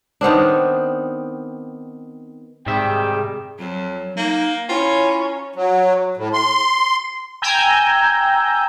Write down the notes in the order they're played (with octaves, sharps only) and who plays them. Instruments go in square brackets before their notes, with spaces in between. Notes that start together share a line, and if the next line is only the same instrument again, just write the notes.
[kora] D#3 B3 C4 D4
[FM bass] G#2 [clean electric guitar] C3 D#3 E5 [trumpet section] G3 G5 [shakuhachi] G#4
[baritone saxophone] F2 [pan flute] F#3
[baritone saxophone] A#3 [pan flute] D#4
[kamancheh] C#4 A#5 [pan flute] E4 [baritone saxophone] F4
[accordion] F#3
A2
C6
[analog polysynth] G5 G#5 A#5 E6 G6